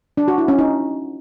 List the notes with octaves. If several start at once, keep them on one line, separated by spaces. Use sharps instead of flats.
D4
F#4
E4
C#4
D#4